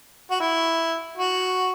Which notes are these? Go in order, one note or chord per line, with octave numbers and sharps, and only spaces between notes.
F#4
E4
F#4